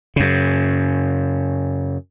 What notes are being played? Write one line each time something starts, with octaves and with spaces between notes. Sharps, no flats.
F#2 C#3